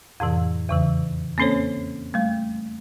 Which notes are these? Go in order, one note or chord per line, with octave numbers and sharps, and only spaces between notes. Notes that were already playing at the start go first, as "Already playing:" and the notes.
F2 A2 C3 E3
E2 C#3 E3
A#3 C4 C#4 A4 C5 C#5
G3 A3